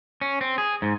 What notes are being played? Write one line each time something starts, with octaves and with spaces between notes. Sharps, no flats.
C#4
C4
G#4
G#2